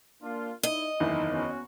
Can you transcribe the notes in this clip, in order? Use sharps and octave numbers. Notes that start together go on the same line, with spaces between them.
A#3 D4 F4
D#4 E4 D#5
F#1 E2 D#3 D#4 E4
B3 C#4 F#4